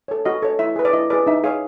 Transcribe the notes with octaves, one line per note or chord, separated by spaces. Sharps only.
A4 C#5
F#4 D#5
A4 C#5
E4 E5
G#4 B4
D5
E4 D#5
G#4 B4 D5
D#4 E5
G#4 C#5 F5